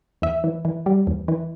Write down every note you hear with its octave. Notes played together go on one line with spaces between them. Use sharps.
E2 E5
E3
E3
G3
E2
E3